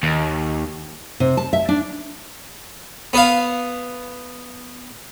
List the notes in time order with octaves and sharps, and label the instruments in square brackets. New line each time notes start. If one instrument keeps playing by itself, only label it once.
[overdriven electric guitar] D#2
[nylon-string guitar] C3
A5
E5
D4
[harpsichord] B3 B4 F5